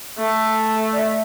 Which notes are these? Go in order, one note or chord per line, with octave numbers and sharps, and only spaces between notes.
A3
D5
E5